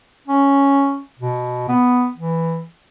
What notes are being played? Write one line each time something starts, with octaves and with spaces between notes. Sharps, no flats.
C#4
B2
B3
E3